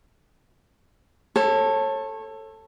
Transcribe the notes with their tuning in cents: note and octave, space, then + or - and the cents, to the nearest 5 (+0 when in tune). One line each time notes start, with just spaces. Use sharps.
A4 +10 C#5 -30